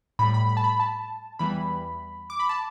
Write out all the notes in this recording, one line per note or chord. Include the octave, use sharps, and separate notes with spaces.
A2 G3 B5
B5
B5
A5
B5
A5
E2 E3 G3 B5
D6
B5
A5